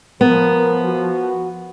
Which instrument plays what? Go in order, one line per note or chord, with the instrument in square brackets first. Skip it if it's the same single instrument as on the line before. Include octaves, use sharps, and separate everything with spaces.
[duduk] F3 [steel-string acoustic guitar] B3 [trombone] A#4
[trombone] F#4